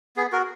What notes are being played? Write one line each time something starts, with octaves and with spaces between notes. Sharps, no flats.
B3 G#4
F#4 A#4